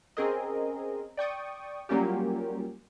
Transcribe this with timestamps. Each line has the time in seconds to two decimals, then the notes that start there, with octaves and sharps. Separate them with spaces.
0.17 C4 C#4 G#4 A#4 D#5
1.17 D5 G5 C#6 D#6
1.89 F#3 G3 A#3 C#4 F4 G4